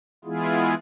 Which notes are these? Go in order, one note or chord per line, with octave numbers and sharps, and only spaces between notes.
E3 G#3 B3 E4 F4 G#4